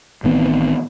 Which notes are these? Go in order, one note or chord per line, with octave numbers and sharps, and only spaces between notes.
A1 D#3 B3 C4